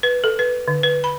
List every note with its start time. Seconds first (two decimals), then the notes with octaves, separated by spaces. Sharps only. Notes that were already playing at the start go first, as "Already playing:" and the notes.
0.03 B4
0.24 A4
0.39 B4
0.68 D3
0.83 B4
1.04 B5